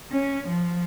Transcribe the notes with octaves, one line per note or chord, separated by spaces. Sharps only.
C#4
F3